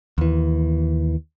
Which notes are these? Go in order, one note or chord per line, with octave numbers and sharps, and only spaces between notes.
D#2 E3